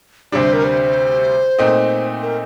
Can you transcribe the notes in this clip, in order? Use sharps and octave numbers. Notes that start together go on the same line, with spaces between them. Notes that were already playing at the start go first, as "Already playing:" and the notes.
D2 C3 G3 D4 C5 D5
A#4
C5
A#2 A3 C4 D#4
A#4